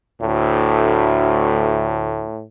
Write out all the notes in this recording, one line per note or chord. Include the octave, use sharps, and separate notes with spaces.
D2 A2